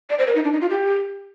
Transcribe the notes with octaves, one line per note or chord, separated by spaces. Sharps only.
D5
C5
A#4
D#4
D4
D#4
F4
G4